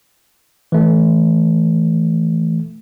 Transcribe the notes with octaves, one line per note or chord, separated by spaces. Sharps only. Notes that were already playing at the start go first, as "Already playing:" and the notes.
E3 A3